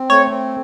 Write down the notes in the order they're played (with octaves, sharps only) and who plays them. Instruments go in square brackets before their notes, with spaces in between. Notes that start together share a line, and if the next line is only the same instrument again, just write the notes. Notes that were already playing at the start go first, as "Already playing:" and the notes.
Already playing: [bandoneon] C4
[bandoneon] A3 [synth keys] C#5
[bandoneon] C4